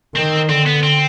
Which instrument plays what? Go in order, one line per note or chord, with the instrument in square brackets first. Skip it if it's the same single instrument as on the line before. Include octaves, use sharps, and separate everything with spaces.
[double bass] D#3 [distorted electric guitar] C4
[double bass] D3 [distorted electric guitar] C4
[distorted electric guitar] B3
C4